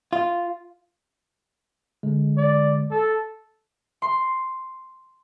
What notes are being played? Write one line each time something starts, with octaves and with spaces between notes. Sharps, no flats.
F4
D3 G#3
D5
A4
C6